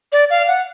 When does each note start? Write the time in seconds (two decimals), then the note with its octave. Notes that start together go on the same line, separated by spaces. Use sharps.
0.12 D5
0.30 F5
0.48 F#5